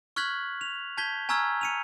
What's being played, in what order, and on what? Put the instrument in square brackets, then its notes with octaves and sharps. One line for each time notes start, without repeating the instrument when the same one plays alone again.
[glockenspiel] C#6 F6 F#6 G#6 B6 F#7
F7
A5 G6 G#6 B6 G7
G#5 A#5 C#6 E6 F6 G#6
C#7 D#7 F7